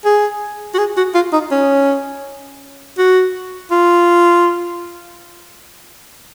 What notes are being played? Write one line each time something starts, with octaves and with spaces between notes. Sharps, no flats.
G#4
F#4
G#4
F#4
F4
D#4
C#4
F#4
F4